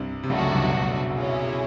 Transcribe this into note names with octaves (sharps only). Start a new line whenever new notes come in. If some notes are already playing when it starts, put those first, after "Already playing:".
Already playing: C2 G2 C3
C3
C#2 C#3 A3 D4 F#4
F#2 F#3
C2 C3
B1 B2
C#4 E4 G#4